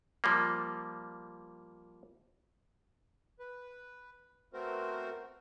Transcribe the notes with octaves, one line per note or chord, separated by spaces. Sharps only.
F3 G3 A#3
B4
A3 B3 C4 F#4 A#4 C5